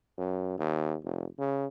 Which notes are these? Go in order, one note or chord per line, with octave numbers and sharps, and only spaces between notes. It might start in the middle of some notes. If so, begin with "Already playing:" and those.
F#2
D#2
F1
C#3